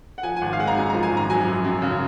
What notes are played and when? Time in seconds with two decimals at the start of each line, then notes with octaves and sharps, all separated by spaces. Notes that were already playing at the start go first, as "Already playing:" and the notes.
0.18 F#5
0.23 F3 G#5
0.36 G#5
0.41 G#1 F#5
0.53 F5
0.60 G#3 F#5
0.67 A#5
0.77 F#2 G#5
0.90 F3 A#5
1.03 G#5
1.12 G#1 A#5
1.30 F#3 G#5
1.46 F#2
1.65 F#2
1.82 C#3